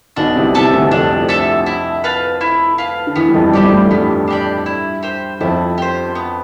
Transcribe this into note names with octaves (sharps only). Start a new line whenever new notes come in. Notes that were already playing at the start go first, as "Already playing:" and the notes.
B1 B2 D4
C2 C3
C2 C3 A4 E5 A5
D2 D3
F2 F3 D4
A4 E5 A5
E4
B4 F5 A5
E4
B4 F5 A5
D3
E2 E3 B3
G3
F2 F3
G2 G3 D4 G4 D5
A2 A3
G2 G3 B3
D4 G4 D5
E4
G4 C5
F2 F3 E4
G4 C5
B3